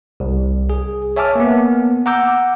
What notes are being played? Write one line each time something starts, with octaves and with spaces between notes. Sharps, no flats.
C2
G#4
C#5 E5 G#5 A5 D6 F6
A#3 B3
F#5 A#5 D6 E6 G6